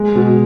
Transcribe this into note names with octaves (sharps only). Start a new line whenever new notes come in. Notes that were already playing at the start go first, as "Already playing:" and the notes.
Already playing: G#3
B2